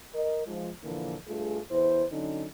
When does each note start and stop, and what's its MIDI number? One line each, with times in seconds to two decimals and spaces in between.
0.13 0.43 70
0.13 0.43 75
0.45 0.69 44
0.45 0.69 53
0.83 1.15 46
0.83 1.15 50
0.83 1.15 52
0.83 1.15 53
0.83 1.15 58
1.27 1.59 43
1.27 1.59 57
1.27 1.59 65
1.27 1.59 68
1.71 2.04 40
1.71 2.04 64
1.71 2.04 72
2.11 2.46 50
2.11 2.46 54
2.11 2.46 61
2.11 2.46 63